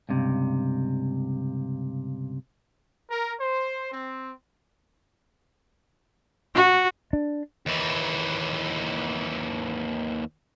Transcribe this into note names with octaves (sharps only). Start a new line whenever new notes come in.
C#2 G2 C3
A#4
C5
C4
F#4
D4
D#2 E3